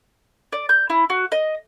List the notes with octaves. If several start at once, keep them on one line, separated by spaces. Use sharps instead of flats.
D5
G6
E4
F#4
D#5